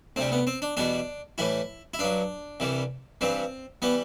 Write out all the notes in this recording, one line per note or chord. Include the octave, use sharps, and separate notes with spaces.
D2 C3 G3 C4
B3
C4
D4
E2 B2 G3 D4
A2 E3 G3 E4
E4
G2 F#3 D4
C2 C3 E3 G3
G2 E3 G3 C4
E3 G3 B3